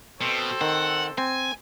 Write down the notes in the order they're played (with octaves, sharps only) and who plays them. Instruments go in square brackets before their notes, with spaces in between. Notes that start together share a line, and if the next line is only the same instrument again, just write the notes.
[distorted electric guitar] B2 [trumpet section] C4 A4 C5
[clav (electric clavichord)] D#3 [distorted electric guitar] F#5
[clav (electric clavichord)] C4 [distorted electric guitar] G#5